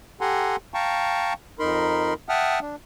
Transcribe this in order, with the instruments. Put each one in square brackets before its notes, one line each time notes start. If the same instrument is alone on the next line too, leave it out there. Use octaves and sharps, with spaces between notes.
[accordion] G4 A4 F#5 G#5 A#5 C6
F5 G5 A5 A#5 C#6
F2 D#4 A#4 B5 C6
E5 F#5 G5 A5 D#6 F6
D4